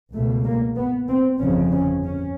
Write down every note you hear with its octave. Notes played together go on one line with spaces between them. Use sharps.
C#2 B2 A3
A#3
B3
C4
G1 F2 C#3 C#4
C#4
C#4